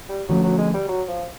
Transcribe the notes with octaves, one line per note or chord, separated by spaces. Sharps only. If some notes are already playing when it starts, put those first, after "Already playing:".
G3
D3 F3 F#3 A3 C#4
F#3
G#3
G3
F#3
F3